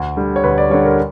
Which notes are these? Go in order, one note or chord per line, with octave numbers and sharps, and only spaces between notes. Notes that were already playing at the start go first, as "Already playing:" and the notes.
Already playing: D2
D3 G3
C#5
D2 B4
D5
D3 G3 C#5
A#4